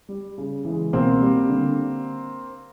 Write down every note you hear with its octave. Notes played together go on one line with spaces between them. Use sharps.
G3
C#3
E3
G#3
B2 A#3 C4
G3
D3